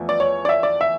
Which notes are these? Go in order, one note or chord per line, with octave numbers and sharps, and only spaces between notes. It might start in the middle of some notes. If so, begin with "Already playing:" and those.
Already playing: E2 F3 A3
D5
C#5
D5
E5
D5
E5